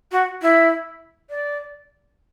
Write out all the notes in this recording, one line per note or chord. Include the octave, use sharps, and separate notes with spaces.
F#4
E4
D5